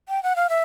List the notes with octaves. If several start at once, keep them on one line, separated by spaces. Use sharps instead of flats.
G5
F#5
F5
E5